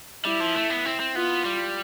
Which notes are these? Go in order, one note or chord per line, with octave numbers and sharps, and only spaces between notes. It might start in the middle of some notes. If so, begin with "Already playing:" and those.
G3 E4
F3
A3
B3
C4
C4
B3 F4
G3